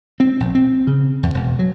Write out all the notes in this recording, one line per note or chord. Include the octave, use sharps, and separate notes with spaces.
C4
A#1
C4
C#3
E2
E1
F#3